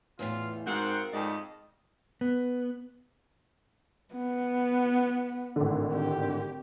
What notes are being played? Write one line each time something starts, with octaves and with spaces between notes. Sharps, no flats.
E2 A2 E3 F4
G#2 D#3 C4 F#4 A#4 F5 F#5
F2 G#2 A3 D5 D#5
B3
B3
G#1 A2 D3
G4